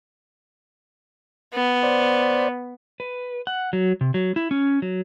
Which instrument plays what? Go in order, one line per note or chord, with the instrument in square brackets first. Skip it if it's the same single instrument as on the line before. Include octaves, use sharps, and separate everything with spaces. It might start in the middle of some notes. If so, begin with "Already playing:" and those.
[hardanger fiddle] B3
[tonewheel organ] C5 D5
[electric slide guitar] B4
F#5
F#3
C3
F#3
E4
C#4
F#3